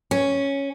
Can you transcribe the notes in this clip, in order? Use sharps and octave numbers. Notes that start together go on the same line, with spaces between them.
C#4